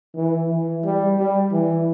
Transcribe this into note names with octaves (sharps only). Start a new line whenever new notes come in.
E3
E3
G3
G3
E3